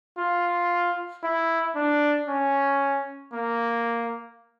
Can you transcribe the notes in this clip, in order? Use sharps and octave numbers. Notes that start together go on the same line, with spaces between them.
F4
E4
D4
C#4
A#3